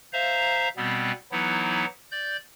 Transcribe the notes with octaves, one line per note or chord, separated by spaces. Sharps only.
C5 E5 F5 A#5
B2 G3 B3 C4
E3 F#3 B3 D#4 E4
D5 G6